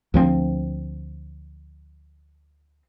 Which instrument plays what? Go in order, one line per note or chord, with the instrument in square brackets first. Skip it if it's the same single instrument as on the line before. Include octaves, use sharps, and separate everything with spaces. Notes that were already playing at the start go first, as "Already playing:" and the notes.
[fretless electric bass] D2 F3 C4